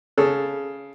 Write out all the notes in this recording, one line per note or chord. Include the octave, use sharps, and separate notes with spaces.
C#3 A4